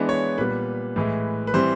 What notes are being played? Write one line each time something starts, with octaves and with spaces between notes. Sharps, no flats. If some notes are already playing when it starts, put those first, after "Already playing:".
Already playing: E3 G#3 B3 D4
C#5
A#2 G3 B3 B4
A2 E3 G#3
B4
E3 G3 C4 C5